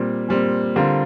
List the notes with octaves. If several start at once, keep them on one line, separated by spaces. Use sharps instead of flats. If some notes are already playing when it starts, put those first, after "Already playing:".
Already playing: A#2 G3 C4
A#2 G3 C4
D3 G3 C4 F4 A#4